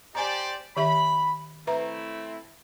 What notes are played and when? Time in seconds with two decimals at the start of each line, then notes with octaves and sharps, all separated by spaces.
0.15 G4 C5 D5 G#5 A#5
0.77 D#3 G4 E5 B5
1.67 A3 C4 E4 B4 E5 A#5